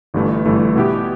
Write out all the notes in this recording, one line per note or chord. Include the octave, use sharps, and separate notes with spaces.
G1 G2 E3 A3
G1 G2 E3 A3
B2 B3 E4 G4